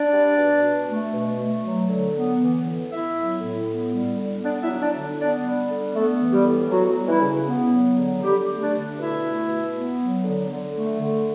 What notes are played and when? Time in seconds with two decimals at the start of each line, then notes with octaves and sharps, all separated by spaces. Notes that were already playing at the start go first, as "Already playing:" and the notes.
Already playing: D4 D5
0.12 G3
0.37 B2
0.62 B2
0.88 A3
1.13 B2
1.38 A3
1.64 F#3
1.89 D3
2.14 B3
2.40 E3
2.65 A2
2.91 B3 E4 E5
3.16 F#3
3.41 A2
3.66 B3
3.92 G3
4.17 D3
4.42 B3 D4 D5
4.61 E4 E5
4.68 F#3
4.80 D4 D5
4.94 D3
5.18 B3 D4 D5
5.44 G3
5.69 D3
5.94 A3 B3 A4
6.20 E3
6.32 G3 G4
6.45 A2
6.70 F#3 B3 F#4
6.96 G3
7.08 E3 E4
7.21 C#3
7.46 B3
7.71 F#3
7.97 D3
8.22 D3 G3 G4
8.47 A3
8.60 D4 D5
8.73 D3
8.98 B2 E4 E5
9.23 A3
9.48 B2
9.74 B3
10.00 F#3
10.24 D3
10.50 D3
10.75 A3
11.01 D3